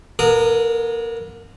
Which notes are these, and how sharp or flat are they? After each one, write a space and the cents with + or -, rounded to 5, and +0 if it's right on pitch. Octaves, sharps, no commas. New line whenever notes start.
B3 -45 A#4 -25 D#6 +0